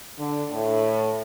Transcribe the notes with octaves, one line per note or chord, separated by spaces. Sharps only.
D3
A2